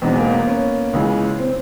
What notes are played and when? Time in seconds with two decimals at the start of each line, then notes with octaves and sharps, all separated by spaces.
0.02 E2 B2 G#3 B3 C4 D#4
0.17 A#3
0.33 B3
0.47 C#4
0.93 C#2 C#3 E3 G#3
1.39 C4